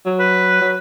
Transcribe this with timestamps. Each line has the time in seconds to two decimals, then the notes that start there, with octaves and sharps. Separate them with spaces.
0.06 F#3
0.20 B4
0.62 F#3